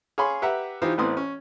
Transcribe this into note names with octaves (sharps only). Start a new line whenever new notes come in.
G#4 C#5 F5 G#5 B5 C6
G4 B4 E5 F#5 A#5
E3 D#4 F4 G4 C5
A1 E3 B3 C4 C6 D#6
C#4